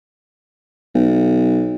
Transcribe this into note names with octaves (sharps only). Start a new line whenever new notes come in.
B1